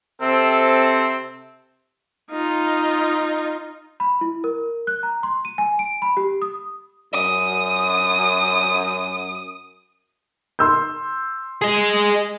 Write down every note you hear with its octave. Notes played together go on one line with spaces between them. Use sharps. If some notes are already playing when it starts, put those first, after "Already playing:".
C3 C4 A4
D#4 F4
B5
E4
A#4
F#6
A#5
C6
D#7
G#5
D7
B5
G4
D#6
F#2 D#6
C6 E6 G6
G#4 D#5